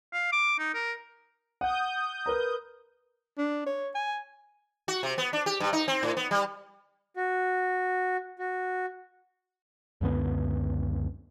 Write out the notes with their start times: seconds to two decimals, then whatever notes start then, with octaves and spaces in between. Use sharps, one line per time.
0.13 F5
0.32 D6
0.59 D#4
0.74 A#4
1.61 F#5 D#6 G6
2.26 A#4 B4 A#5
3.38 D4
3.66 C#5
3.95 G#5
4.88 F#4
5.03 C3
5.18 B3
5.33 D4
5.46 G4
5.60 G2
5.73 D#4
5.88 C4
6.03 A2
6.17 B3
6.31 G3
7.17 F#4
8.39 F#4
10.01 C#2 F#2 D3 B3